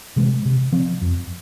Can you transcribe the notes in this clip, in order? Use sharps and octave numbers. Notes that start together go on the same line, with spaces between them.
C3 E3 G#3
C3
F3 C4
F2